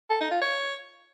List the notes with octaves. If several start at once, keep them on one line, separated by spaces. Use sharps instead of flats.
A4
D#4
F4
C#5